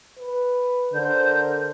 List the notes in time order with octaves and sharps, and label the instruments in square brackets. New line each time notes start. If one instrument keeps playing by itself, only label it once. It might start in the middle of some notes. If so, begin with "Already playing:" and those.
[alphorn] B4
[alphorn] D3 [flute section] A#4 C5 G6